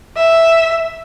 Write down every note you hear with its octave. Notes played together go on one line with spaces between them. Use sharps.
E5